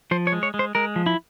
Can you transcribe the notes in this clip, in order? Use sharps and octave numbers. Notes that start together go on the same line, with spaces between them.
F3 C5
C#5
G#3
C#5
G#3
C5
G#3 A#4
F3
E4